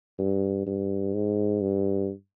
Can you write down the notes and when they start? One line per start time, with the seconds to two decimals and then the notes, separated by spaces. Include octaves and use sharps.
0.19 G2
0.66 G2
1.14 G#2
1.61 G2